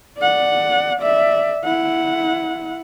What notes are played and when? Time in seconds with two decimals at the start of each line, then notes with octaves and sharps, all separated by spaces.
0.18 D5 F#5
1.00 D5 E5
1.65 E4 F#5